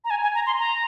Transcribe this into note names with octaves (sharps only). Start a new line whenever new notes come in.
A#5
G#5
G#5
A#5
C6
A#5